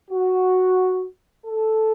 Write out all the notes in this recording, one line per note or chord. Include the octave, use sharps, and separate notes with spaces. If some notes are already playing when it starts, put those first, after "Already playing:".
F#4
A4